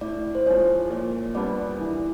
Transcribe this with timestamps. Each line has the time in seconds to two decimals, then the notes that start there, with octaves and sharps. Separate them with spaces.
0.01 A2 D5
0.35 C5
0.46 F3 G#3 C#5
0.90 A#2 C#5
1.35 G3 B3 D4 D5
1.80 E3